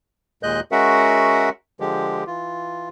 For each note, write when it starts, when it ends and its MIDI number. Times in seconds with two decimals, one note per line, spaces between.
0.43 0.60 39
0.43 0.60 46
0.43 0.60 56
0.43 0.60 75
0.43 0.60 90
0.43 0.60 91
0.72 1.49 56
0.72 1.49 61
0.72 1.49 66
0.72 1.49 70
0.72 1.49 76
0.72 1.49 78
1.80 2.24 50
1.80 2.24 53
1.80 2.24 56
1.80 2.24 67
2.27 2.89 52
2.27 2.89 65